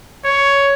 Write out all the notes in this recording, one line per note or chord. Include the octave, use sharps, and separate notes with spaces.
C#5